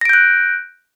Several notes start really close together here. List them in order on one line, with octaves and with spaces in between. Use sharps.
A#6 D7 G6 F#6